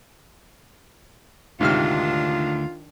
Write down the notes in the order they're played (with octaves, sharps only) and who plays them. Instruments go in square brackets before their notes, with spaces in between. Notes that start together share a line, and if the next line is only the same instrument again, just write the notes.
[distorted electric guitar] D2 [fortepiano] G#2 C3 F6 [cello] D#3 D4 [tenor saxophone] F4